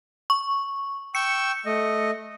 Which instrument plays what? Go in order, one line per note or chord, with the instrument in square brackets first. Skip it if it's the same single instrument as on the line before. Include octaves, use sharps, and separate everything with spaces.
[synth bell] C#6
[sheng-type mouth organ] G5 C#6 E6 [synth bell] C#7
[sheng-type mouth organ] A3 D#5